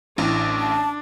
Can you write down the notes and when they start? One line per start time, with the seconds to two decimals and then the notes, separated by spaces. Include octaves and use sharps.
0.18 A1 A2 D4
0.59 A5